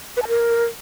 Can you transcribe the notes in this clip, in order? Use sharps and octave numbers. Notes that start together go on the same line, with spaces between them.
B4
A5
A#4